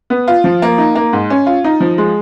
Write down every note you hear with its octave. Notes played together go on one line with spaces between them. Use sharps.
B3
F4
F3
A#3
D#4
A#3
G#2
C#4
F4
D#4
F3
G#3